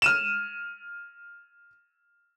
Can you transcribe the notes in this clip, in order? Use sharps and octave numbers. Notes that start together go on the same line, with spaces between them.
F6 D#7 E7